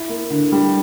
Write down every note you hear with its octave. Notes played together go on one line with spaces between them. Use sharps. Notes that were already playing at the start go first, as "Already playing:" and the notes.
Already playing: E4
A#3
D3
G3